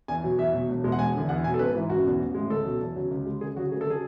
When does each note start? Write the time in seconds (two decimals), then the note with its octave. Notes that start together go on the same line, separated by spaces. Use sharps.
0.08 E2 G#5
0.23 B2 F#3
0.38 E2 E5
0.54 B2 F#3
0.69 E1
0.84 E2 B2 G#3
0.92 F#5
0.99 E1 G#5
1.14 E2 D3
1.29 E2 F#5
1.44 B2 F#3 G#5
1.54 A4
1.59 G#1 B4
1.75 G#2 E3
1.89 F#1 F#4
2.05 E2 B2
2.20 A1
2.34 G#3
2.39 A2
2.50 C#2 A4
2.65 B2 F#3
2.81 E2
2.95 C#3 F#3
3.11 C#2
3.26 C#3 G#3
3.41 C#2 G#4
3.56 F#3 F#4
3.59 C#3
3.71 D2 G#4
3.81 A4
3.86 C#3 F#3 G#4